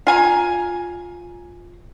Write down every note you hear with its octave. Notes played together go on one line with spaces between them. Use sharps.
F4 G#5 A#5